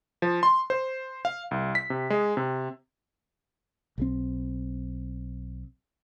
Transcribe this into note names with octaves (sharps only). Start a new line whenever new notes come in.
F3
C6
C5
F5
C2
B6
C3
G#3
C3
B1 G3 C4